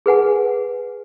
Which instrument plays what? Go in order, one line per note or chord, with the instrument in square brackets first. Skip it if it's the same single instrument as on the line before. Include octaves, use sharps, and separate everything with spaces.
[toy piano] G#4 B4 F#5 G#5